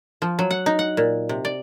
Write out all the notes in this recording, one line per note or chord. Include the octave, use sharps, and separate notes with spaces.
F3
F#3
F#5
D#4
F#5
A#2
C3
D5